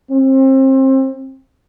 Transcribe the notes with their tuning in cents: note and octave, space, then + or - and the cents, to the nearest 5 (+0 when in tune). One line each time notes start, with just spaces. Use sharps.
C4 +30